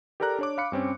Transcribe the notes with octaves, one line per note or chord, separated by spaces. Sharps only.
G4 A4 A#4 D5 A#5 F#6
D4 C#5 D6
F5 B5 F#6 C#7
G2 C4 C#4